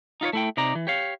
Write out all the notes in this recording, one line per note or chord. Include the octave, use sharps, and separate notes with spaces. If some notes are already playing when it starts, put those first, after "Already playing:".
D#4 F4 B4 C#5
A3 E4 G5
C3 D#4 D5 A#5
E3
G4 C#5 F5